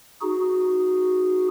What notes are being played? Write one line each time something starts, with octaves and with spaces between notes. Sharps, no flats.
D#4 F#4 G#4